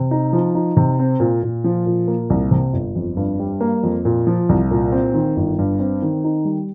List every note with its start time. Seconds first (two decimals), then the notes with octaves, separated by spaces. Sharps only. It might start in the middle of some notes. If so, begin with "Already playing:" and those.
Already playing: C3
0.11 D#4
0.33 F3
0.55 D#4
0.77 C3
0.99 C4
1.20 A#2
1.43 A#2
1.64 F3
1.86 A#2
2.08 A#3
2.30 C2
2.51 C3
2.73 G1
2.95 F2
3.17 G2
3.39 G3
3.61 A#3
3.83 F2
4.05 A#2
4.27 F3
4.49 C2
4.71 A#2
4.92 C4
5.14 D#3
5.36 G1
5.59 G2
5.79 C4
6.02 D#3
6.24 D#4
6.45 G3